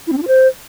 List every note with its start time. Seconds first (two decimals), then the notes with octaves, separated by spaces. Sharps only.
0.07 E4
0.12 C4
0.17 D4
0.22 F4
0.27 C5